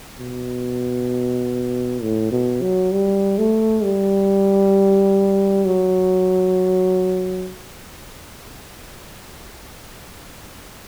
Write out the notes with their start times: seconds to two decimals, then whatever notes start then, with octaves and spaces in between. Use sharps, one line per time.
0.19 B2
2.02 A2
2.32 B2
2.61 F#3
2.92 G3
3.38 A3
3.83 G3
5.65 F#3